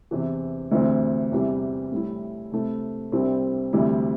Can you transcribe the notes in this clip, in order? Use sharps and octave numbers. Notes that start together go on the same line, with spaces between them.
E2 C3 E3
D2 C3 E3 C4
E2 C3 E3 G3
A2 G3 E4
C3 A3 E4
C2 C3 G3 C4 E4
D2 C3 E3 G3 E4